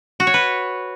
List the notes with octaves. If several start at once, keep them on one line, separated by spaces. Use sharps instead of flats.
F#4
C#5
B4